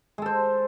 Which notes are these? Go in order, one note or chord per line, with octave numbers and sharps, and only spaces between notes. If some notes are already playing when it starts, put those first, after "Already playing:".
G#3 A4 C5